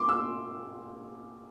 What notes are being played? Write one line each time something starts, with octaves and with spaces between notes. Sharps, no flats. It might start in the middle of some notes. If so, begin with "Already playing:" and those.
Already playing: C6 D6
E6